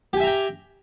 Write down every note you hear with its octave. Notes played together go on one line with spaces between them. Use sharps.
G4 E5 G5 G#5 A#5